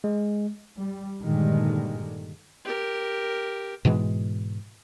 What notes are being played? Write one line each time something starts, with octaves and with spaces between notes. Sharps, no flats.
G#3
G3
G2 A#2 D3 D#3 G3 G#3
G4 A#4
G#2 B2 E3 G#3